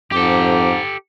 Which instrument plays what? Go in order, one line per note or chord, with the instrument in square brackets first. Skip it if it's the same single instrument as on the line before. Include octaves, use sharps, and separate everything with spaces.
[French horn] F2 [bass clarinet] G#2 [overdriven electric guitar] G4 A4 [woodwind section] D6